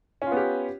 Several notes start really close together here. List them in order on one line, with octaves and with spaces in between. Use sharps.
C#4 F4 B3 G4